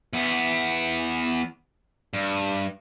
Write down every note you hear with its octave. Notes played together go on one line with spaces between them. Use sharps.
E2 B3
G2